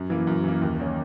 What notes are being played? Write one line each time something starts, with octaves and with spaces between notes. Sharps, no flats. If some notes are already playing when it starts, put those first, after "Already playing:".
Already playing: F#2
E3 A#3
F#2
E3 A#3
D#2
D#3 A#3 C#4